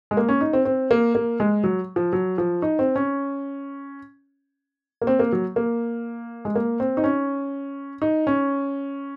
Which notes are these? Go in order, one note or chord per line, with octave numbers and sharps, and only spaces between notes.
G#3
A#3
C#4
D#4
C4
C4
A#3
A#3
G#3
F#3
F3
F#3
F3
D#4
C4
C#4
A#3
C4
A#3
F#3
A#3
G#3
A#3
C4
D#4
C#4
D#4
C#4